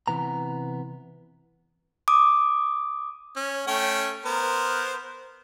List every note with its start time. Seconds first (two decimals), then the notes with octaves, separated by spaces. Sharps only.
0.08 C3 E3 B3 A#5
2.08 D6 D#6
3.36 C#4
3.67 A3 C#4 G5
4.25 B3 A#4 C5